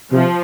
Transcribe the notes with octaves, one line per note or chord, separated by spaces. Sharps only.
C3 F3